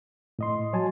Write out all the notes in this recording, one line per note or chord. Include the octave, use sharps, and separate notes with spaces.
A2 D#5 C6
F#3 C#5 G#5 A5